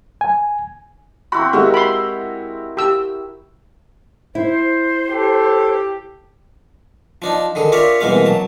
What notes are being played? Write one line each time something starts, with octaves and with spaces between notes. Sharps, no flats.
G#5
C4 E4 F#4 B5
G#3 F#4 G4 A#4 E5
B5 C6
G4 E6
E4 C5
G4 A4
F3 D4 D#4
D3 D#3 G#4
F4 G4 A#4 C#5 D5 E5
C2 B2 E3 G#3 A#3 F5
F#3 A5